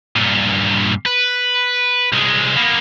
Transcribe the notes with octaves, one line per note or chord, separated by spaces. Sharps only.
G2 A#2
B4
C2 G#3
A#3 B3